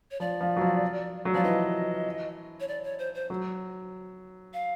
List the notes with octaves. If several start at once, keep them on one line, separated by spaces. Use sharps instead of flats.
C#5
F3 D5
F3
F#3
F3
F#3
F3 D5
E3 D#5
C#5
D5
C#5
C5
C5
F#3
F5